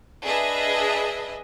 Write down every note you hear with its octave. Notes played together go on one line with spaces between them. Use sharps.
D4 G#4 B4 D#5 E5